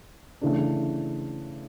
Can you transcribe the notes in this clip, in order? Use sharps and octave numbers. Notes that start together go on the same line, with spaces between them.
C#3 E3 A3 D4